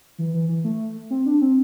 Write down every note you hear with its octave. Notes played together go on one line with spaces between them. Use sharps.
E3
E3
E3
A3
C4
D4
C4